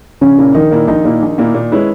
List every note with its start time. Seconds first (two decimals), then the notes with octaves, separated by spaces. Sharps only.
0.21 A#1 C#3 C#4
0.38 A#2 A#3 E4
0.54 A#1 D#3 D#4
0.71 A#2 A#3 E4
0.88 A#1 D#3 D#4
1.04 A#2 A#3 E4
1.22 A#1
1.38 A#2 A#3 E4
1.54 A#2
1.72 G#3 C#4 E4 B4